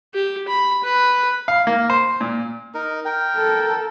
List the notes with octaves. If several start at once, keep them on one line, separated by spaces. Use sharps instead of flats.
G4
B5
B4
F5
A#3
C5
A#2
D#4 A#4
A#4 G5
A4